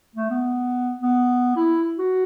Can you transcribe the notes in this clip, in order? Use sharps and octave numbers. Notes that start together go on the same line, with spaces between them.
A3
B3
B3
E4
F#4